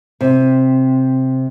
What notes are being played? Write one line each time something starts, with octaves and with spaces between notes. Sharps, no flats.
C3